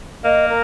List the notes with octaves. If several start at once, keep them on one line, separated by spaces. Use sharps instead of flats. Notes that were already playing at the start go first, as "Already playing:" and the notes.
A#3 D#5
A#4